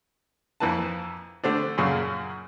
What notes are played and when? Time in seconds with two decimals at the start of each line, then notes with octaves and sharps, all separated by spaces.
0.60 F2 E3 A#3 B4 A5
1.44 D3 A3 C4 D4
1.78 F#2 A#2 C#3